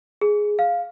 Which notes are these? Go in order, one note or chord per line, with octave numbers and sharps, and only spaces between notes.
G#4
F5